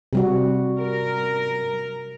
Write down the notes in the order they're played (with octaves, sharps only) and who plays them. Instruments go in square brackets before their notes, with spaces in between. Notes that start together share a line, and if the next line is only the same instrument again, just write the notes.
[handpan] C3 G3 F#4
[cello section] A#4